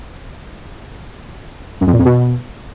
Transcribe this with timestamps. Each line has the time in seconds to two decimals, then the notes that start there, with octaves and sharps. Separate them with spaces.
1.81 F#2
1.87 F2
1.93 A#2
1.99 F2
2.05 B2